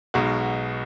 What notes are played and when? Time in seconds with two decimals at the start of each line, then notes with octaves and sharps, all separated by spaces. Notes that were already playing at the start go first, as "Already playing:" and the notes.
0.14 B1 B2 G#3 F#4